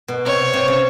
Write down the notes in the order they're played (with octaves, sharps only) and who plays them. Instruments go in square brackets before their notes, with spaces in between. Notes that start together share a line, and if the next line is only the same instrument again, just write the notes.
[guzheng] B2
[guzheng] C3 [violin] C#5
[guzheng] C3
C#3